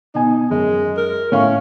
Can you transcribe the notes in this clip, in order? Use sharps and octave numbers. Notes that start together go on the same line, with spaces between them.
B2 D#4 G#5
F#2 G#3
A#4
A2 C#4 F5 C#6